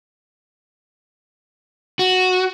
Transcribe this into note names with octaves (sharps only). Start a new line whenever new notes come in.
F#4